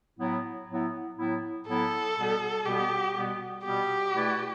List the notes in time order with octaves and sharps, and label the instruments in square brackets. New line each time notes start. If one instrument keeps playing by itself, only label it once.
[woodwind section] A2 F#3 B3 E4
A2 F#3 B3 E4
A2 F#3 B3 E4
[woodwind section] A2 F#3 B3 E4 [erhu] A4
[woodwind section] B2 G3 B3
[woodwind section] B2 G3 B3 [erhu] G4
[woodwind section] B2 G3 B3
[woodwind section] B2 G3 B3 [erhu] G4
[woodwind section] B2 A3 E4 B4 D5